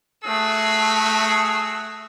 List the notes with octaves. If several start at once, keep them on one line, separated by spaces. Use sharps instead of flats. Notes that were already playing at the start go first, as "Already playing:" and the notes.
A3 F#4 G#4 E6